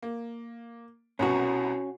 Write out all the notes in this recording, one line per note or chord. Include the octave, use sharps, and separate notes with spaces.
A#3
C2 B2 C#4 F#4